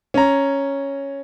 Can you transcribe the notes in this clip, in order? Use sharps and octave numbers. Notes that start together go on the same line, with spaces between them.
C#4 A#5